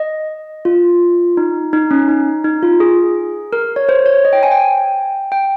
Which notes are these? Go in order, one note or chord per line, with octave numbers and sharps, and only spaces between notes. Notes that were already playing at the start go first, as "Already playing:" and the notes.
Already playing: D#5
F4
D#4
D#4
C#4
D#4
D#4
F4
G#4
A#4
C#5
C5
C#5
D#5
G5
G#5
G5
G5